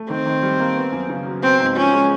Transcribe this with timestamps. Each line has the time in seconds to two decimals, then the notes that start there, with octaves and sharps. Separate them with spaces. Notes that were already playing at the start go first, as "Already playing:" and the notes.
Already playing: A3
0.10 D#3 C4
0.26 D#3
0.42 G3
0.60 A#3
0.76 B3
0.92 F#2
1.09 C#3
1.26 F#3
1.43 B3 C4
1.60 G#2
1.76 F3 C#4
1.93 G#3